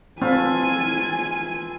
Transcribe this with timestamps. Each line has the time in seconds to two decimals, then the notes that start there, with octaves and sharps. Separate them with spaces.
0.22 C4 F4 A4 B4 G#5